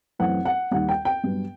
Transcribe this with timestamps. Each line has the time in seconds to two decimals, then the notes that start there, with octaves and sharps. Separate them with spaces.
0.19 F#2 E3 A3 C4 F#5
0.45 F#5
0.71 D#2 D#3 G3 F#5
0.89 G5
1.05 G5
1.24 G2 F#3 B3